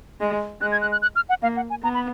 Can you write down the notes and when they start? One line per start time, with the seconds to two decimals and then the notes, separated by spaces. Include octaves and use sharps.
0.20 G#3
0.61 G#3 F#6
0.72 G#6
0.81 F#6
0.92 F#6
1.02 F#6
1.16 F6
1.29 F#5
1.42 A#3 F5
1.56 F#5
1.70 G#5
1.83 B3 A#5
1.94 B5